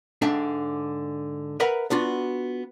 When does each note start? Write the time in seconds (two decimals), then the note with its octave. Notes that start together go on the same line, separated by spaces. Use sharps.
0.22 G#2 D3 D4 E5 G5 A5
1.60 A#4 B4 E5 F#5 A#5 B5
1.90 B3 D4 F4 F#4